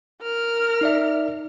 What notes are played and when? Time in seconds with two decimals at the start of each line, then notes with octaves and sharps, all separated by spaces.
0.22 A#4 F6
0.81 D#4 D5 E5